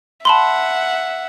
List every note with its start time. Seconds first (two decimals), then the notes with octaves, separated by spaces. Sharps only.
0.25 E5 F#5 A5 B5 C6